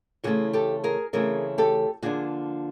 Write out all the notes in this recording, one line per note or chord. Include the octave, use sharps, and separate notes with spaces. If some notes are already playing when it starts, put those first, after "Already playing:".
C#3 E3 A3 C4 F#4 G#4
G4 A4
G#4 A#4
C#3 E3 A3 C4 G#4 A#4
G4 A4
D3 F3 A#3 D4 F#4 G#4